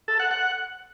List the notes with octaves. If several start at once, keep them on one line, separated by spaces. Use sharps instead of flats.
A4
F#5
F#5